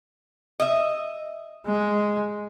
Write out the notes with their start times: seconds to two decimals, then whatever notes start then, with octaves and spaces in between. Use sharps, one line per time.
0.60 D#5 E5
1.66 G#3